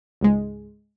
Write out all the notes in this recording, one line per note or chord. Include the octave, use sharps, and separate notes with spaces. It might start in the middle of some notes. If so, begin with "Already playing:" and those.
C#2 G#2 G#3